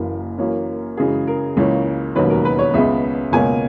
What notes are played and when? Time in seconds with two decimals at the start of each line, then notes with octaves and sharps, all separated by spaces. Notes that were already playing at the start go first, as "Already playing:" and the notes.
Already playing: F#1 F#2 E3 A#3 A#4
0.38 F#2 E3 A#3 C#4
0.97 F#2 C#3 E3 G#3 G#4
1.27 A#4
1.57 C#2 C#3 E3 A#3 C#4
2.15 E1 D#2 D#3 F#3 C#4 B4
2.30 A#4
2.45 B4
2.59 C#5
2.74 C#2 C#3 G#3 B3 E5
3.32 C#2 B2 A#3 C#4 G#5